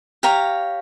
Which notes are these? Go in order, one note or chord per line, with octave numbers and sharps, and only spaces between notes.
G4 C#5 F5 A#5